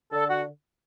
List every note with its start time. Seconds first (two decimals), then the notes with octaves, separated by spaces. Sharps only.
0.12 D3 A4
0.29 F#4